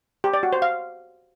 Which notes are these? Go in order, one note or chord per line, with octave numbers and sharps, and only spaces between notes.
G4
D5
F#4
C5
F5